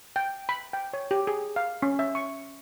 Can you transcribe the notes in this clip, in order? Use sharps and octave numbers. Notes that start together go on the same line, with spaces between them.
G5
B5
G5
C#5
G4
G#4
F5
C#4
E5
C#6